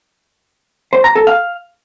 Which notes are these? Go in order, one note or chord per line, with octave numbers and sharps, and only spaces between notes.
C5
A#5
A4
F5